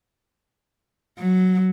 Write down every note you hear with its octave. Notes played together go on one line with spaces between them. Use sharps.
F#3